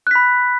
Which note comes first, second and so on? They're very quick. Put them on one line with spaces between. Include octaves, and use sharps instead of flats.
F#6 B6 B5